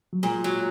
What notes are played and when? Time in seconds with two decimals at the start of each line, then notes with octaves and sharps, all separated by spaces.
0.13 F#3
0.23 A#2 G#3
0.44 F#3